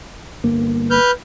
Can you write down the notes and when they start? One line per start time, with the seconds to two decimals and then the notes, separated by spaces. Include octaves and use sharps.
0.44 G1 A#3
0.91 B4 F6 G6